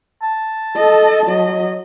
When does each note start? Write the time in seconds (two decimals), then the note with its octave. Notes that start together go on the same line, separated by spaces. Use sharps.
0.22 A5
0.76 A4 D#5
1.26 F#3 D#5